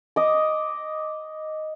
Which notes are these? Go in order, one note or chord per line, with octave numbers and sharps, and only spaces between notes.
D#5 D6